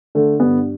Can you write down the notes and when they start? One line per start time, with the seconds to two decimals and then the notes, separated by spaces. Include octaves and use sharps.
0.15 D3 A3
0.39 G2 B3